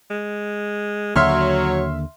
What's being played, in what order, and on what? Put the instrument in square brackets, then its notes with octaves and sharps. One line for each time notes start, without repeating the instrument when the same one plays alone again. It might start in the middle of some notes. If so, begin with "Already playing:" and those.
[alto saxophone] G#3
[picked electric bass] D#2 D3 A#3 [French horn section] F#3 [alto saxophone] C#5 [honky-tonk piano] E5 C6 F6